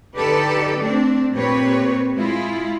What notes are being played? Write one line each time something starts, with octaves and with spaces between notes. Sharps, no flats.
D3 D#4 G4 A4 B4 D5
A3 C4 D4
A#2 C4 G4 B4 C#5
G#3 E4 F4